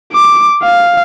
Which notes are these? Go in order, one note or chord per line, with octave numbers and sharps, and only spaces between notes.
D6
F5